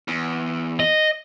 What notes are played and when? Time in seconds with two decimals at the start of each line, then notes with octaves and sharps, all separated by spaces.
0.08 E2
0.80 D#5